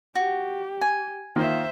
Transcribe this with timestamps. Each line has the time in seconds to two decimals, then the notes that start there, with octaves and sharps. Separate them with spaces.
0.15 F#4 G4
0.81 G#5
1.36 D#3 A#3 F4 C5 E5